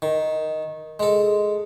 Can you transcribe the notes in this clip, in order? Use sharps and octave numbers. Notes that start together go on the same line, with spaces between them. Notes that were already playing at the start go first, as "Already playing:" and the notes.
D#3
G#3 A4